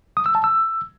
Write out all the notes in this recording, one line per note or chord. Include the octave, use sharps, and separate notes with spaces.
D#6
E6
A5
E6